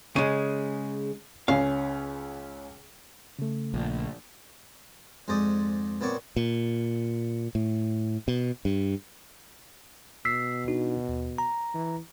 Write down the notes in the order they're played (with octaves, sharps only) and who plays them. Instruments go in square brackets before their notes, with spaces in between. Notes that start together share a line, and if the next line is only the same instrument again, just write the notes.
[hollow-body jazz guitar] C#3 G#3 [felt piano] D#7
[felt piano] C#2 C#4 [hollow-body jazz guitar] F5
[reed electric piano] C#3 A3
[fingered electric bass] A#1
[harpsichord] F2 G#2 G#3 C5 D5 D#6
A#2 B3 C4 C#5 D5 C#6
[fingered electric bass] A#2
A2
B2
G2
[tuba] B2 [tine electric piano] E6 B6 C7
[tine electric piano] D4 D#4 F#4
D#2
A#5
[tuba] E3